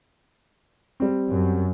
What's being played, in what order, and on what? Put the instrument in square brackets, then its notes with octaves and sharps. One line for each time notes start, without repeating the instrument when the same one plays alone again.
[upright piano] G3 C4
[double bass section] F#2